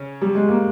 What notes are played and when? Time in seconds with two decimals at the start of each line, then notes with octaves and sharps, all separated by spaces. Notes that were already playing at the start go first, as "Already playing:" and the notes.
Already playing: C#3 C#4
0.21 G3
0.35 G#3
0.48 A#3